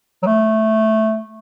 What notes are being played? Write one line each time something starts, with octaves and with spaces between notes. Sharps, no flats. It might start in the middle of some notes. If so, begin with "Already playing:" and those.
F#3
A3